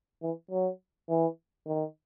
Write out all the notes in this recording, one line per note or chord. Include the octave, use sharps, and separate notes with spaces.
E3
F#3
E3
D#3